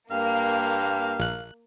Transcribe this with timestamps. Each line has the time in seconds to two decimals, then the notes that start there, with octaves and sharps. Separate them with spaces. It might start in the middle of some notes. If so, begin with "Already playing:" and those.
0.11 G2 A#3 F5
1.20 A#1 F#6